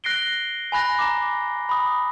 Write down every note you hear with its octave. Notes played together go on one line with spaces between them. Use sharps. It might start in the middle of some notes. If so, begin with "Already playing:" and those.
F#6 A#6 C7 D7 G7
G#5 B5 F#6 A#6
A#5 D6
B5 D#6